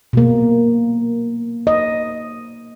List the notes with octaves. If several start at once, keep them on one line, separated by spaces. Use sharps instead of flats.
B2 A#3
D#5